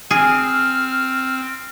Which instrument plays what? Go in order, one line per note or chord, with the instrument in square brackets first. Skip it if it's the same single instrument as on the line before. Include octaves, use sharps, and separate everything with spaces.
[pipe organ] C4 [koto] G#4 [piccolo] F6